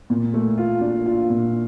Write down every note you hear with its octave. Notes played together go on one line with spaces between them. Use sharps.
A#2
A3
F4
D4
F4
A#2